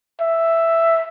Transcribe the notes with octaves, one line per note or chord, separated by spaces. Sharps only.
E5